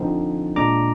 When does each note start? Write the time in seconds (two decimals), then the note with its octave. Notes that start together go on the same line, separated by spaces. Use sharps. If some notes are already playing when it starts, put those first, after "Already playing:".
Already playing: D3 F3 C4 D#4
0.56 A#2 G#3 D4 A#5 D6